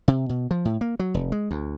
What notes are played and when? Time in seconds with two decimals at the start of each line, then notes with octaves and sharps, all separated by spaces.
0.08 C3
0.29 B2
0.51 F3
0.65 A2
0.81 A#3
0.99 F#3
1.14 F1
1.32 G#3
1.51 D2